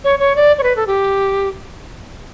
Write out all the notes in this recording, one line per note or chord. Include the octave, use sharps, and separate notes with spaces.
C#5
C#5
D5
C#5
B4
A4
G4